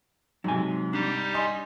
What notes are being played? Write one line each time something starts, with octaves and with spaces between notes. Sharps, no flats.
G#2 C3 F#3 G#5
G3 D4 D#4 G4
D#5 G#5 C6